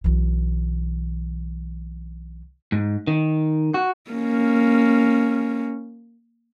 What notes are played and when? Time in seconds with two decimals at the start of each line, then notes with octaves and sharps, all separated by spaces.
0.04 B1 E3
2.72 G#2
3.07 D#3
3.74 F#4
4.10 A#3 C#4